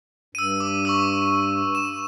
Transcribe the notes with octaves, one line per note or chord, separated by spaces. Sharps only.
G2 E6 D#7
D6
C#6 D6 E6
E7